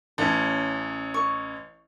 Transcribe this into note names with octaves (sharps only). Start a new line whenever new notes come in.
A1 C#4 A5
C#6